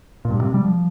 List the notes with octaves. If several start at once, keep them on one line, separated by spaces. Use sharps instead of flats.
A#2
G2
C3
G3
F3